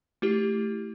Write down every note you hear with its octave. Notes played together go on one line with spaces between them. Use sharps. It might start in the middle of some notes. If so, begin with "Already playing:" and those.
A3 E4 G4